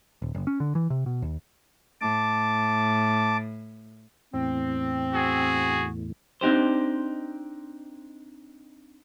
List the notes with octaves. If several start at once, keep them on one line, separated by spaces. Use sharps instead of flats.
D#1
F#1
C#4
D3
E3
C3
B2
D#2
A2 A5 D6
E2 A2 C4
F#4 G#4
C4 D4 D#4 G4 C5